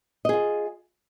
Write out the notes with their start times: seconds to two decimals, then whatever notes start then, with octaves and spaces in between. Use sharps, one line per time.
0.25 D#5
0.29 G#4
0.33 F4